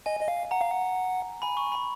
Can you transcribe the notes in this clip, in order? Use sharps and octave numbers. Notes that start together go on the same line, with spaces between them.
D#5 G#5
D#5
F5
F#5 A#5
F5
F#5
G#5 B5
C#6
B5